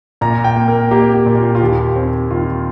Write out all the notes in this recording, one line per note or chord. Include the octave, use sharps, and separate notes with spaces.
A#2 A#5
G5
A#3
A#4
A#3 G4
G4
A#2
F4
F4
D#2 G4
C4
D#3 F4